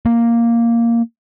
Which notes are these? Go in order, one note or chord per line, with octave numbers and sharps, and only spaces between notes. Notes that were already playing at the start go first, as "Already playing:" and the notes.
A#3